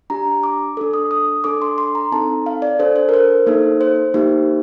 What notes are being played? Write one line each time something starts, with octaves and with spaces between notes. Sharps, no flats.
D4 G4 A#5
D6
D4 A4
D#6
D#6
D4 A4 D6
C6
C6
A#5
C4 D#4 A4 A5
F5
D5
D4 A4 C5
C5
A#4
C5
A#3 D#4 A4
C5
A#3 D#4 G4